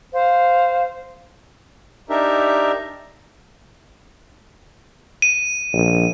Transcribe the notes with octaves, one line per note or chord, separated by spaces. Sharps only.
C5 F5
D4 D#4 G4 A#4 E5
D#7
A#1